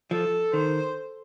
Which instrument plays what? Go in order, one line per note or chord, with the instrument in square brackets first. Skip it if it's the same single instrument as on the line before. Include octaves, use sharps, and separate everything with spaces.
[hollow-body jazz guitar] F3 [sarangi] A4
[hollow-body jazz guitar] D#3 [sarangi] C5